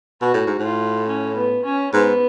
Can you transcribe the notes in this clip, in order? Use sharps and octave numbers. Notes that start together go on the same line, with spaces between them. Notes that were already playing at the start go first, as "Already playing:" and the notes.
B2 F#4
A2
G#2
A2 F4
C#4
B3
C#4
G#2 B3